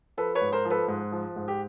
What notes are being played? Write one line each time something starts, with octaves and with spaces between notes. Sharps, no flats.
F3 A4 B4
B4 C#5
G#2
A#4 C5
F3
A4 B4
G#2
F3
G#2
G4